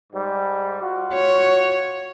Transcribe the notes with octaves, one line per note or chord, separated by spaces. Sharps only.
G#2 G3
F4 F#4
C#5